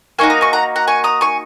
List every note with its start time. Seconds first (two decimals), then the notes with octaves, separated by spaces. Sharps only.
0.19 A#3 D#4 F#4 G#5 C#6
0.30 A#5 D#6
0.41 G#5 C#6
0.53 F#5 A#5
0.76 F#5 A#5
0.87 G#5 C#6
1.04 A#5 D#6
1.21 G#5 C#6